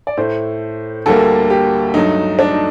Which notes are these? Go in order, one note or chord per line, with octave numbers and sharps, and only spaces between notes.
D5
A2 A3 C5
D2 D3 G3 A#3 A4
G4
G2 F#3 A3 D#4
D4
D#4